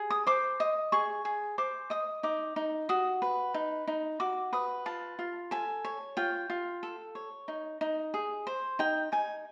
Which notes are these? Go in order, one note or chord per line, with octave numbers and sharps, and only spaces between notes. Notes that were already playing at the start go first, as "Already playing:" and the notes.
Already playing: G#4
D#6
C5 D6
D#5
G#4 C#6
G#4
C5 D6
D#5 D#6
D#4 D6
D#4
F#4 D#6
B4
D#4
D#4
F#4 D6
B4 D#6
F4 A5
F4
A4 G#5
C#5
F4 G5
F4
A4
C#5
D#4
D#4
G#4
C5
D#4 G5
D#4 G#5